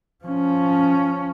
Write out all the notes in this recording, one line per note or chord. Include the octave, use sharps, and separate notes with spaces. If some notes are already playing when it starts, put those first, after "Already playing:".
F3 C#4